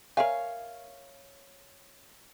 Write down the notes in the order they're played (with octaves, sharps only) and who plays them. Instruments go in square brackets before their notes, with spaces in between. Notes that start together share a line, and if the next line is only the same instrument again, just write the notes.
[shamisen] A#4 E5 G#5 [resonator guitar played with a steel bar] C#5 F5